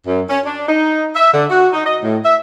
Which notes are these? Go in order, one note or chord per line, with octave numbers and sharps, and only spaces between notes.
F#2
C#4
D4
D#4
E5
D3
F#4
D#4
D#5
A2
E5